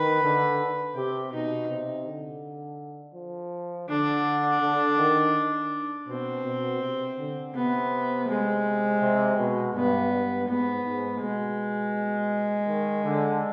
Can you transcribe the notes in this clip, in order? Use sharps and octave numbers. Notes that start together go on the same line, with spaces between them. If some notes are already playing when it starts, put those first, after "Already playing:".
Already playing: D#3 B4
D3
C3 G4
B2 D#4
C3
D3
F3
D3 D4
D3
D#3
B2 C4
B2
C3
D3
C3 B3
G#3
C3
B2
G2 B3
G2
G#2 B3
G#2
B2 G#3
D#3
D3